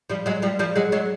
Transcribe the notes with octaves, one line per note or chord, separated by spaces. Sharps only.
F3 G3
F#3 G#3
F3 G3
F3 G3
F#3 G#3
F#3 G#3